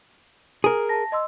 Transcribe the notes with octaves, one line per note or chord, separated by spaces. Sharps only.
G#4 A#4
A5 A#6
D#5 C6 E6